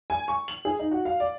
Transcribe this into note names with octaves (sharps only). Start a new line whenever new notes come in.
G#5
C#6
F#7
G#4
D#4
F#4
F5
D5